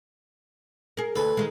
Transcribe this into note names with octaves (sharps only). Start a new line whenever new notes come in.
G#4 A#4
D2 A4 B4 G#5
D#3 G#3